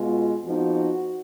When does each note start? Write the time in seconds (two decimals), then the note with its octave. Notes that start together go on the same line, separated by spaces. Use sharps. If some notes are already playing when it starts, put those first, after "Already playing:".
Already playing: B2 G#3 B3 F4
0.44 F2 F3 B3 D#4 F#4